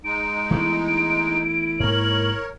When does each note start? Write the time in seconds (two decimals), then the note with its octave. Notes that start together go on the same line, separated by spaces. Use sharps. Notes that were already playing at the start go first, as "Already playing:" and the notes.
0.04 G#3 D#4 D7
0.51 E3 A3 B3 E4
1.80 G#2 A#3 A#4 C#5 F#7